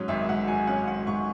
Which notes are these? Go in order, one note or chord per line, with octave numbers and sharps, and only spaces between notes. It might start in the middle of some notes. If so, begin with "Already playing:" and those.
Already playing: G#2 F#3 C#4
G#1 E5
G#2 F#5
F#3 G#5
C#4 F#5
G#1 F#5
G#2 C#6